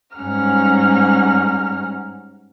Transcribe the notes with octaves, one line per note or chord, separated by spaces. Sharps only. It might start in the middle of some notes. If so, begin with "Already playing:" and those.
G#2 G3 C#4 F#5 A#5 F6